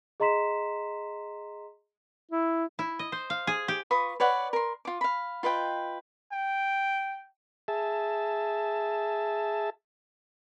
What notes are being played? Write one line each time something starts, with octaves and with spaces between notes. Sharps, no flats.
G#4 D#5 A#5 C6 B6 E7
E4
E4
D#5
C5
F5
G#4
G4
F4 B4 C#6 D#6
B4 C#5 D5 F#5
A#4 C6
F4 D6
F5 B5
F4 B4 D#5 G5
G5
G#4 E5 A5